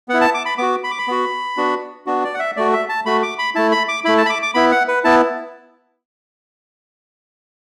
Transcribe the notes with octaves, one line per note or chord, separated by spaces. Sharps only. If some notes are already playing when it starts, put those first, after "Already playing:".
B3 F#5
E4
A5
D6
B5
B3 F#4 D6
B5
D6
B5
B3 F#4
B3 D4 F#4
B3 D4 F#4
D5
F#5
E5
A3 F#4 D5
E5
A5
A3 F#4 B5
D6
B5
A3 E4 A5
B5
D6
A3 E4 B5
A5
B5
D6
D6
B3 E4 B5
F#5
B4
B3 E4 A5